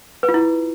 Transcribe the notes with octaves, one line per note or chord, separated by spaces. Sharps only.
B4
F4
E4